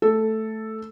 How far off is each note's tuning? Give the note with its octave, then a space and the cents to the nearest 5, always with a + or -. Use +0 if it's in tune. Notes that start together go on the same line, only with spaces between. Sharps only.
A3 +0 A4 +0